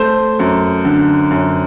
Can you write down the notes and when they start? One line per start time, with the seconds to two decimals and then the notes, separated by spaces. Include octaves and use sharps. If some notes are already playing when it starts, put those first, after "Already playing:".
Already playing: A3 C5
0.39 F#2
0.85 D3
1.31 F#2